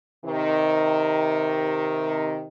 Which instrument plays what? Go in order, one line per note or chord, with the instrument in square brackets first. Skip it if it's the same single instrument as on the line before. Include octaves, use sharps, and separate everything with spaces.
[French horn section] C3 D#3